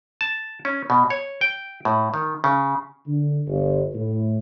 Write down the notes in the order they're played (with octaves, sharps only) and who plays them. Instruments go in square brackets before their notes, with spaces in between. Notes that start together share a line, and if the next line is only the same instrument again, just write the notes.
[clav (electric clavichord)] A5
C#4
B2
C#5
G5
A2
D#3
C#3
[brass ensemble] D3
G1
A2